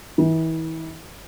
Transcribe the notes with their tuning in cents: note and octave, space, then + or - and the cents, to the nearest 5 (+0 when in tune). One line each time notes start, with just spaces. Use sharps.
E3 -35